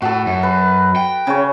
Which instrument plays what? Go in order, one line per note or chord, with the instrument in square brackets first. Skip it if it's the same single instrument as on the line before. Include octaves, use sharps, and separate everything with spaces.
[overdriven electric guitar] A2 [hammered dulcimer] F#4 A4
[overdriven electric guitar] F#2
[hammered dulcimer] B4
[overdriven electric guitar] G5
[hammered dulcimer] C#3 C#5